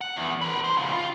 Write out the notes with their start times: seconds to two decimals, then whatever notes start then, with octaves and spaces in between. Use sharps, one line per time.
0.01 F#5
0.16 E2
0.41 A#4 B4
0.64 C5
0.77 C#2 G#2
0.92 F4